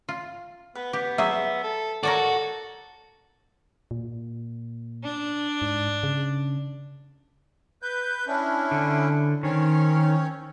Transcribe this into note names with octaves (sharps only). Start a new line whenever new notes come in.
F4
B3 B4
B3 G4
F#3 G3 G#4 E5
A4
F#4 A4 A#4 C#5 D5
A#2
D4
G#2
C#3
B4 G6
C#4 D4 E4
D3
D#3 C4 C#4 C#5